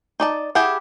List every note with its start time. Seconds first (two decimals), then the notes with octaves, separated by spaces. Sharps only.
0.20 D#4 D5 A5
0.55 E4 G4 G#4 E5 F#5